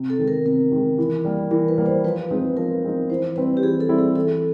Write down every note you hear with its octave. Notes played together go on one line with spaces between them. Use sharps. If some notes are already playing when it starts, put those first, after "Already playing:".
Already playing: C3
A4
D#3 G#3
A#4
C3 A#4
D#3 G#3
E3
G3 A#3
E3 A#4
B4
G3 A#3
C5
F3 B4
G#3 C4 D#4
F3 A#4
G#3 C4 D#4
E3 C5
G3 C4 E4 B4
G4
E3 G#4
A4
G3 C4 E4
G#4
E3 A4